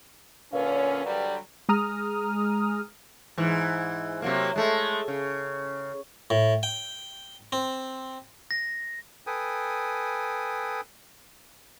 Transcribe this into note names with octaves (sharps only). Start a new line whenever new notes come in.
A#2 D3 C#4 A#4 B4 F5
D3 F#3 G3
G#3 G#4 A#5 D#6 F6
G#2 E3
C3 F#3 A#3
G#3 A3
C#3
A2
G5
C4
A#6
A4 B4 G5 G#5 D#6